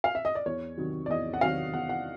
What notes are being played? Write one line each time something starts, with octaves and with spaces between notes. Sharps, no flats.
F5
E5
D#5
D5
E2 C#5
C3 D#3 F#3
D5
E2 D#5
F#5
C3 D#3 F#3 F5
E2 F#5
F#5